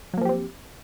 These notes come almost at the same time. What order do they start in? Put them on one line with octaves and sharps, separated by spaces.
F#3 A#3 F3 G4 C4